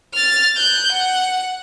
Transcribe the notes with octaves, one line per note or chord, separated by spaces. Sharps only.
F6 A6
F#6 G6
F#5